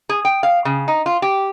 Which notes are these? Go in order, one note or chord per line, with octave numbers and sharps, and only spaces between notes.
G#4
G5
F5
C#3
D#4
F4
G4